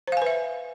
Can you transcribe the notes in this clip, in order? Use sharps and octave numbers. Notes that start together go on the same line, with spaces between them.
B4 C5 E5 F5 G#5